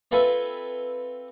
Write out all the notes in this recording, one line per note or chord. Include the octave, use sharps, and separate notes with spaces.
C4 F4 A4 B4 E5 G#5